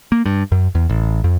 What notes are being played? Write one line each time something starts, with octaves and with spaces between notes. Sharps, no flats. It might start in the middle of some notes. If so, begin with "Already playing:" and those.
A#3
G2
F#2
E2
A1
F2